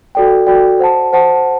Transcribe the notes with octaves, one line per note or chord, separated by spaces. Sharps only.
F#4 A4 D5 G5
F#4 A4 D5 G5
C5 F#5 A5
C5 F#5 A5